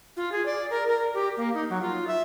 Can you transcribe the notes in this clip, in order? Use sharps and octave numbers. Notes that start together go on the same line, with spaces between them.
F4
G#4
D5
A#4
A#4
G4
A#3
D#4
F#3
F4
E5